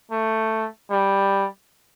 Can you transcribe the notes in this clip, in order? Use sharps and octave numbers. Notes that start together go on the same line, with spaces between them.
A3
G3